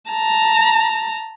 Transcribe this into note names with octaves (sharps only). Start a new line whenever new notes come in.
A5 A#5